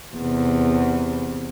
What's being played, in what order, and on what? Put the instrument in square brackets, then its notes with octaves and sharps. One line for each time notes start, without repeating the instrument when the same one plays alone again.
[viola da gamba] E2 C3